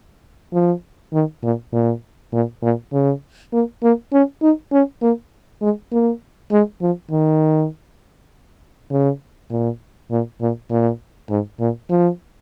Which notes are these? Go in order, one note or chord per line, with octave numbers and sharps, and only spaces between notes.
F3
D#3
A#2
A#2
A#2
A#2
C#3
A#3
A#3
C#4
D#4
C#4
A#3
G#3
A#3
G#3
F3
D#3
C#3
A#2
A#2
A#2
A#2
G#2
A#2
F3